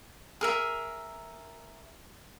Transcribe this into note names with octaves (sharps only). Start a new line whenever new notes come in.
G#4 A#4 E5